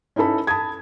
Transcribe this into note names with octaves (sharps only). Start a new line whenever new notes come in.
C#4 D#4 E4 A4 B5
A5 B5 D#6 G#6